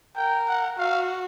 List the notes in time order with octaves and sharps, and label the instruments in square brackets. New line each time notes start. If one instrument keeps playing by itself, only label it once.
[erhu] A#4 [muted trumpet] G5
[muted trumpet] F#5
[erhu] F#4 [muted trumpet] F5